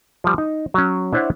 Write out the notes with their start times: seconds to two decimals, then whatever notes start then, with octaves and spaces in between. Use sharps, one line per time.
0.24 F3 G3
0.38 D#4
0.74 F#3 C#4
1.13 D4 E4 C5 C#5 E5 F#5